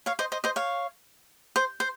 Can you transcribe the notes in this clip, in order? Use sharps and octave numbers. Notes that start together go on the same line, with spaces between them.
C#5 F5
C5 D#5
C5 D#5
C5 D#5
C#5 F5
C5
C5